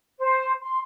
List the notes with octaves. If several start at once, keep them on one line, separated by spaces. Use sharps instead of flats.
C5
C6